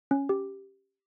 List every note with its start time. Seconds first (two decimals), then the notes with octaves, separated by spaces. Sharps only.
0.11 C#4
0.29 G4